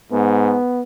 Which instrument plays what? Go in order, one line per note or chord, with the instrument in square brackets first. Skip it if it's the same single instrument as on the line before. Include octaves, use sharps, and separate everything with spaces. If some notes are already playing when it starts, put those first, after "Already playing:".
[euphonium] G#2 [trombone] B3